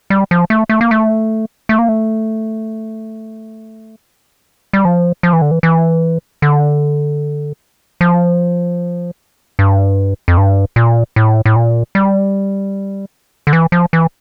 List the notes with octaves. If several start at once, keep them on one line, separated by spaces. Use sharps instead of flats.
G3
F3
A3
A3
A#3
A3
A3
A#3
A3
G3
F3
F3
E3
D3
E3
E3
D3
F3
G2
F2
G2
A#2
A2
A2
A#2
G3
D3
E3
F3
E3